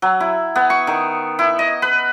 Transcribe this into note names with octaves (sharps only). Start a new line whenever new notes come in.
F#3
E4
B3
C#6
D#3
E4
D#5
B4